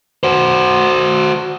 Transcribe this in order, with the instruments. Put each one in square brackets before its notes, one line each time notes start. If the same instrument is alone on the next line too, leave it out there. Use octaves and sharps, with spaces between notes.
[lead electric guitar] F#4 C5